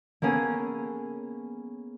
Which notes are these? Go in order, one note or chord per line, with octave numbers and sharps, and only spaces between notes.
A#3 B3 C#4 G#4 A4